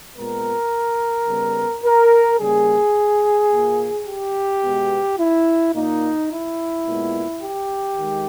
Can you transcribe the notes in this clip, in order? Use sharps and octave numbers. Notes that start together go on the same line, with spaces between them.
A#2 G#3 B3 A#4
C#3 G3 B3
A#4
C#3 G3 A#3 G#4
A#2 A#3
G4
B2 G#3 B3
E4
A#2 A#3 D#4
E4
A#2 G#3 B3
G4
D#3 G#3